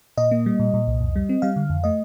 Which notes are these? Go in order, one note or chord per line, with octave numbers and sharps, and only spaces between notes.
A#2 D#5
A#3
G3
A#2
A#2
C2
F2
G3
C4
G3 F5
D3
F2
A3 D#5